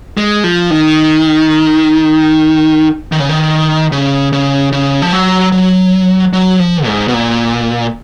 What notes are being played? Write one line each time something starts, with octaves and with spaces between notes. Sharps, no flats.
G#3
F3
D#3
D#3
C#3
D#3
C#3
C#3
C#3
F3
F#3
F#3
F#3
F3
G#2
B2
A#2